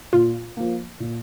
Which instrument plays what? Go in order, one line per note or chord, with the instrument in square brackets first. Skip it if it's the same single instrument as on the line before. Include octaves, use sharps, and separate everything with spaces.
[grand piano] A#2 [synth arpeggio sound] F4
[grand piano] F3 A#3
A#2